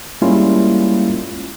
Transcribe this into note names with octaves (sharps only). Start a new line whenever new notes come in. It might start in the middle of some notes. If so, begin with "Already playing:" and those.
G3 G#3 A#3 C#4 E4 F4